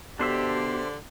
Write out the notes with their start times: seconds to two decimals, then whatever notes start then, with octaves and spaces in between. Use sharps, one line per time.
0.19 B2 D3 D4 G4 C5 E5